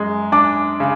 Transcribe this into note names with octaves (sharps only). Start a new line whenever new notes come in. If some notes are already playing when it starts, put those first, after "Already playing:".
Already playing: F#2 G#3
D4 D6
C#3